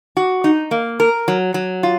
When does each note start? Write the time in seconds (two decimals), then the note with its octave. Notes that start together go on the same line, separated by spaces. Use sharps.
0.17 F#4
0.44 D#4
0.71 A#3
1.00 A#4
1.28 F#3
1.54 F#3
1.83 F4